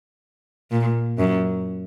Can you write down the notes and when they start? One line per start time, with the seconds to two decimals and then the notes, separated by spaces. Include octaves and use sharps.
0.71 A#2
1.18 F#2